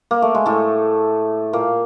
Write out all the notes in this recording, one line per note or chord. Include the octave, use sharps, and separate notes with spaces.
A#3
A3
G#3
A2 A3
A#2 A#3